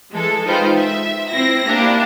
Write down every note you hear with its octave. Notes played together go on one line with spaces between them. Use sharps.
E3 G#3 A4
G#3 D#4 F4 B4 C5 G5
E5
C4 E4 A#6
A#3 D4 E4 G4